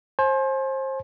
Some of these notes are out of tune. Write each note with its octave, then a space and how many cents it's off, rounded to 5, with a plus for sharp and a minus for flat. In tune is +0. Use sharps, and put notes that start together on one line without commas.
C5 +30 G#5 +40